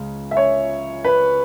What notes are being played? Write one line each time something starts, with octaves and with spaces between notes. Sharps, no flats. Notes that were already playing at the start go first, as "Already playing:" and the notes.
Already playing: C#2 C#3 G#3
E5
C#5
B4